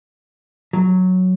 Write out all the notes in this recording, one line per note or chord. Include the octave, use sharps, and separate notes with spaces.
F#3